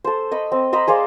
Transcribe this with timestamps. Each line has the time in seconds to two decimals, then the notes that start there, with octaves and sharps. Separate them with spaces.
0.04 A4 C5
0.31 D#5 B5 C#6
0.52 C4
0.73 C5 D#5 A#5 B5
0.87 G#4 C5 D5 F5